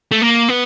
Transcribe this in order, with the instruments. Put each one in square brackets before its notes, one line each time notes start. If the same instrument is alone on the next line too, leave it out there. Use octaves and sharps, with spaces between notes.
[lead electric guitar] A3
A#3
B3